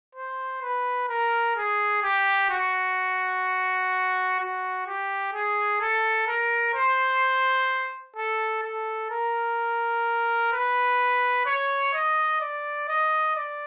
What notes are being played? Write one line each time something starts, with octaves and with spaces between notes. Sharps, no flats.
C5
B4
A#4
G#4
G4
F#4
F#4
G4
G#4
A4
A#4
C5
A4
A4
A#4
B4
C#5
D#5
D5
D#5
D5